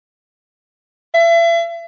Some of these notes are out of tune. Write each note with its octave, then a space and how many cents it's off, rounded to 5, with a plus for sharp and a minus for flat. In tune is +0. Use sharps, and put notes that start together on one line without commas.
E5 +35